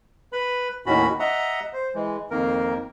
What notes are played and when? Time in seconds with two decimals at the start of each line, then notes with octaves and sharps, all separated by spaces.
0.33 B4 B5
0.86 D#2 A2 D#3 C#4 F#4 B5
1.20 D#5 E5 F#5 A#5
1.73 C5
1.95 E3 G#3
2.31 F2 D#3 A#3 A#4